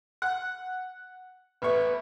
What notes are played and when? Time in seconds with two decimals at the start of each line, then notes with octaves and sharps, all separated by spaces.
0.22 F#5
1.62 A1 B3 B4 C#6